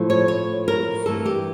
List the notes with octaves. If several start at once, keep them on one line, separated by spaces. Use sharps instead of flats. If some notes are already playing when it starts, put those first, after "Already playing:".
Already playing: A2 F3 A3
C#5
C#5
A#4
G2 E3 A3 A4
G4